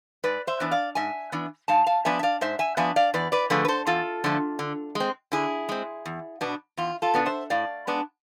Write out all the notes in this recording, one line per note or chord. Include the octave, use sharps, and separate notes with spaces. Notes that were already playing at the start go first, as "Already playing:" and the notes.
G#2 B4 D5
C5 E5
E3 B3 D4
D5 F5
G#2 E5 G#5
E3 B3 D4
G#2 F5 A5
F5 A5
F3 B3 D4 E5 G#5
E5
D5 F5
G#2 C5 E5
E5 G#5
F3 B3 D4 E5 G#5
D5 F5
E2 B4 D5
B4 D5
D3 F3 A3 G#4 B4
B4
A4 C5
E2 F4 A4
D3 F3 A3
D3
G#3
C4
D3 E4 G#4
G#3 C4
E2
B2 B3 D4
E2 F4
F4 A4
B2 B3 D4
C5 E5
A2 D5 F5
G#3 B3 D4